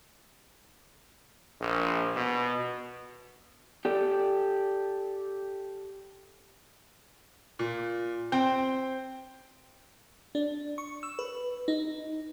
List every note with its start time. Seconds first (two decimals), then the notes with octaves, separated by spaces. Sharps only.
1.61 A#1
2.16 B2
3.85 G4 A4 D5
7.59 A#2
8.32 C4 G5
10.35 D4
10.78 C#6
11.03 E6
11.19 B4
11.68 D#4